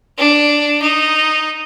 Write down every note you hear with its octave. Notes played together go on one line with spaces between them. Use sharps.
D4
D#4